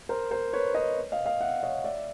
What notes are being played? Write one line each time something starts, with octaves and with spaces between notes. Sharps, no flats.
A#4 C5
A#4 C5
B4 C#5
C#5 D#5
D#5 F5
D#5 F5
E5 F#5
C#5 D#5
D5 E5